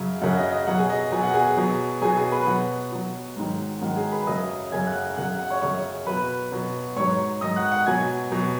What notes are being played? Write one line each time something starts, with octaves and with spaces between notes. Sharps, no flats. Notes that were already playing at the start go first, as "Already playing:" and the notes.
Already playing: F#2 C#3 F#3
F#2 C#3 F#3 F#5
D#5
D#5
B2 F#3 F#5
G#4 G#5
D#5
B2 F#3 G#5
F#5
G#4 G#5
B2 F#3
B2 F#3 G#4 G#5
G#4 G#5
B4 B5
B2 F#3 F#5
B2 F#3
G#2 D#3 F#3
G#2 D#3 F#3 F#5
G#4 G#5
B4 B5
F#2 C#3 F#3 D#5 D#6
F#2 C#3 F#3 G#5 G#6
F#5 F#6
F#2 C#3 F#3 F#5 F#6
F#5
F#5
C#5 C#6
F#2 C#3 F#3 C#5 C#6
B2 F#3 B4 B5
B2 F#3
G#2 F#3 C#5 C#6
G#2 F#3 D#5 D#6
F#5 F#6
F#5 F#6
B2 F#3 G#5 G#6
B2 F#3